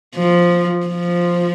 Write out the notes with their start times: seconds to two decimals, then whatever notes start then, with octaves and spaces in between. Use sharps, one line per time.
0.15 F3
0.87 F3